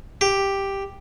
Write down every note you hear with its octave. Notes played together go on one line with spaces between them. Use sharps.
G4